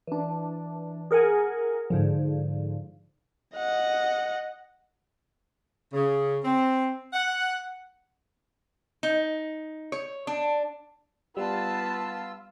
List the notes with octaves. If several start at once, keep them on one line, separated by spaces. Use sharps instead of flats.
E3 D4
G#4 A#4 F#5 G#5
G#2 D3 F3
D#5 F#5
C#3
C4
F#5
D#4
C#5
D4
G3 B3 F4 A5 E6